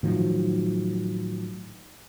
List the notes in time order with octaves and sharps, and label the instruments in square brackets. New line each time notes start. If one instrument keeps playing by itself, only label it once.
[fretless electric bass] A2 D#3 F3 F#3